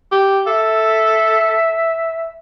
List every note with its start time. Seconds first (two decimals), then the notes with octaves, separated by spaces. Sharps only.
0.12 G4
0.47 A4 E5